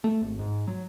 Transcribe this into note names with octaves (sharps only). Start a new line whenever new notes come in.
A3
G#1
G#2
F#3